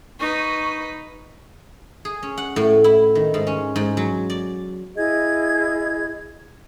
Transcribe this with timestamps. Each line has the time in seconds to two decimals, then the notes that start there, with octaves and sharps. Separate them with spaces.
0.20 D#4 B4 C#6
2.05 G#4
2.23 C#4
2.38 F#5
2.56 A2
2.84 E4
3.15 D#3
3.34 G#2
3.47 C#4
3.76 G#2
3.97 F#3
4.30 D5
4.97 E4 G#4 D#5 G#6